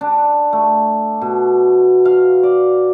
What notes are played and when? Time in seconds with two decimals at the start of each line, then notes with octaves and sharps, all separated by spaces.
0.01 D4
0.53 A3
1.21 B2
2.05 F5
2.43 D5